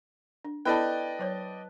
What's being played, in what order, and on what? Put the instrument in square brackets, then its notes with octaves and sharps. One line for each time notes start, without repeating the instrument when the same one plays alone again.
[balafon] D4
[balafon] B3 E4 A4 [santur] B4 A5 [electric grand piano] D5 D#5 G5
[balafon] F#3 C5 C#5